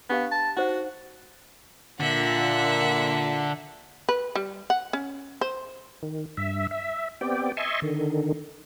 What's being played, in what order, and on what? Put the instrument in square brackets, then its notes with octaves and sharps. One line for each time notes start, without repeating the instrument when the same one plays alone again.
[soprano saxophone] B3 [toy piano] D4 G4 F5
[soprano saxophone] A5
[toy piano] D#4 C5 F#5 [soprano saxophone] F#4
[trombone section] A#2 [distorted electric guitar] D3 [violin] E5 F#5
[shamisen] B4
G3
F#5
C#4
C5
[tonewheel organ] D#3
G2 E5
E5
B3 C4 G4 D5 G5
D#5 E5 G#5 A5 C6 C#6
D3 D#3